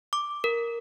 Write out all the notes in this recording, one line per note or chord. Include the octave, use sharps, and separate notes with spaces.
D6
A#4